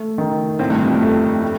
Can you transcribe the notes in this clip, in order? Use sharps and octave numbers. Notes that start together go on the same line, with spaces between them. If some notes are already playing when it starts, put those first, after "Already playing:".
Already playing: A3
D#3
A2 C4
G2
F2
G2
A3
A3